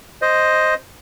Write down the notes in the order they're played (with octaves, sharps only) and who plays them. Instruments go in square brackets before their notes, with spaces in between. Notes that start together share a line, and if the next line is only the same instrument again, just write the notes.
[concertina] C5 D#5